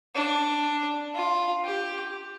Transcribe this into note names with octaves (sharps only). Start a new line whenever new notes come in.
D4
F4
G4